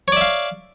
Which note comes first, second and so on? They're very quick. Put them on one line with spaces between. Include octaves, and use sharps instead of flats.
C#5 D5 E5 F5